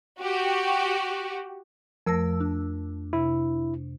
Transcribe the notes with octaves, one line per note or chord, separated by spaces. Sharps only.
F#4 G4
F2 F3 A3 A#4 E6 A#6
D4
C3 E4